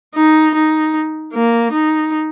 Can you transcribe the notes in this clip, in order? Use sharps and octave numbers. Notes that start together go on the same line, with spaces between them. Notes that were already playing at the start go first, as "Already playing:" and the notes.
D#4
D#4
A#3
D#4